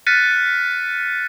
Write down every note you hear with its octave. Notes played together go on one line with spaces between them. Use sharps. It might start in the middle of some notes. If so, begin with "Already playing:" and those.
F6 F#6 A6 B6 C#7 D#7